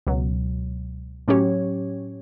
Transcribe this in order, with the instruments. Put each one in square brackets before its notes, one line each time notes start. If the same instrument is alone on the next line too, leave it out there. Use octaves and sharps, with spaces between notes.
[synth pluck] C#2 B2 F#3
A2 F#3 C#4 G4 C#5